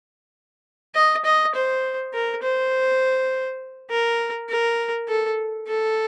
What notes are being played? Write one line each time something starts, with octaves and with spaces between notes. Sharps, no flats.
D#5
D#5
C5
A#4
C5
A#4
A#4
A4
A4